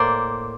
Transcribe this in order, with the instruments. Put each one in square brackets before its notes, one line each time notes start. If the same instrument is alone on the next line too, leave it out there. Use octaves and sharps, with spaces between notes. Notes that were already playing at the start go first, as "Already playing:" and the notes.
Already playing: [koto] A2 A#3 A#4 C5 D5